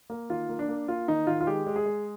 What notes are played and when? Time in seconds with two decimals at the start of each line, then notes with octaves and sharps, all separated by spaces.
0.10 A#3
0.29 D#3 F4
0.49 A#3
0.59 D4
0.69 A#3
0.88 A#3 F4
1.08 D#3 D#4
1.27 D#3 F4
1.41 F4
1.47 G#3 G4
1.66 G#3
1.76 G#4
1.86 G#3